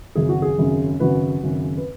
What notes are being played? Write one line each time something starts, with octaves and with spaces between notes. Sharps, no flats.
G#1 F#2 C#3 G#4
F#4
G#4
G#1 F#2 C#3
G#1 F#2 C#3 F#4 B4
G#1 F#2 C#3
B4